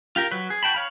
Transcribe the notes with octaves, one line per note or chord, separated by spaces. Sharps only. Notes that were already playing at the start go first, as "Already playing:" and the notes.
F4 G4 A#4
F#3 B4
G#4
F#4 G5 A5 B5
C#5 F5 B5